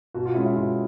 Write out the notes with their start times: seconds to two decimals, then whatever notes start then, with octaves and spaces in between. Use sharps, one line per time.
0.14 B2 F#4
0.25 F4
0.35 G#3 C#4 E4
0.46 E4
0.56 B2 F4